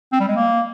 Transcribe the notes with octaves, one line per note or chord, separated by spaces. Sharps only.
C4
G3
G#3
A#3